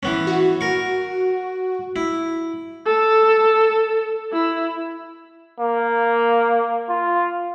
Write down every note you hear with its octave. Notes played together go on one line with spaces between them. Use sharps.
E3 B3 C#4
F#4
A#4 C#6
E4
A4
E4
A#3
F4